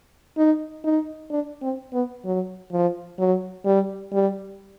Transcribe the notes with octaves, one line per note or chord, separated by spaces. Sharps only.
D#4
D#4
D4
C4
B3
F#3
F3
F#3
G3
G3